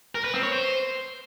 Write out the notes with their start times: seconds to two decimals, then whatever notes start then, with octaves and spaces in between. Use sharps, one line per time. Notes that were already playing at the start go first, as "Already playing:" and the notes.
0.15 A#4
0.24 B4
0.34 C4
0.43 C#5
0.53 C5